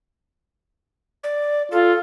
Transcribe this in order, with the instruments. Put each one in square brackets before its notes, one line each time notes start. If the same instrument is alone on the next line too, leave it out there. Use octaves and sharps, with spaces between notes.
[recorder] D5
[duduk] F4 [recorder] A4